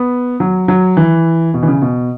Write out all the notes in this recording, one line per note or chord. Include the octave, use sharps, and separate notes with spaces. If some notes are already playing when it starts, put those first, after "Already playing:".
Already playing: B3
F#3
F#3
E3
B2
E3
C#3
B2